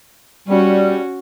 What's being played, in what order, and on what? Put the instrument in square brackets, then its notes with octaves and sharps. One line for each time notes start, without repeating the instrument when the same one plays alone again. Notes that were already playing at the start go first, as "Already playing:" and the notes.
[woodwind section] G3 [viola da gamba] C#4 F#4